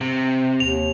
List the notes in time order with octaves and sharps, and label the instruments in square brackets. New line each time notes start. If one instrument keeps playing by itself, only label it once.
[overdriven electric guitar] C3
[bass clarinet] D#2 [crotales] F7